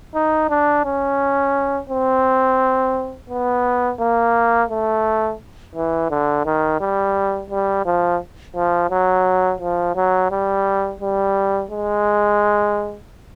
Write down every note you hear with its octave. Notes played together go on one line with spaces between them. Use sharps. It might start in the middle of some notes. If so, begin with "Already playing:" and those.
D#4
D4
C#4
C4
B3
A#3
A3
E3
D3
D#3
G3
G3
F3
F3
F#3
F3
F#3
G3
G3
G#3